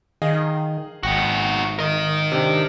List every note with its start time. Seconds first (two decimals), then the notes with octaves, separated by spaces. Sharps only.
0.22 D#3 G#4 D#5 F5
1.03 G#1 D#4 F#4 G5 A#6
1.79 A#4 D#5
2.32 C3 D4 G4